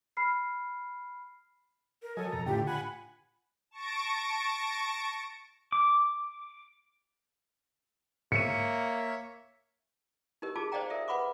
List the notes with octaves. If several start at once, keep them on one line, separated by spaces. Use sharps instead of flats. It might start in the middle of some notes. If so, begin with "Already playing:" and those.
B5 F6 C7
A#4
F#3 A4 D#5 G#5
F2 B2 A#5 A6
A2 D3 F4 G4 G5
F#5 G#5 B5
A5 C#6 A#6 D7
D6
G#2 A#3 C#5 E5 C#7 D#7
D#4 G4 A#4 D#5
D#4 F4 G#4 A5 D6
C5 D5 D#5 F5 G5 A#5
A4 A#4 E5
B4 F#5 B5 C#6 D6